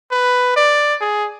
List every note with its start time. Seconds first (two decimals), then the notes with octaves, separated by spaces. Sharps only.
0.11 B4
0.56 D5
1.01 G#4